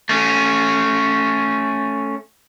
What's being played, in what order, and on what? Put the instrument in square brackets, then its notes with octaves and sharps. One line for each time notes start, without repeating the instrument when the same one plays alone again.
[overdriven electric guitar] A3 C#4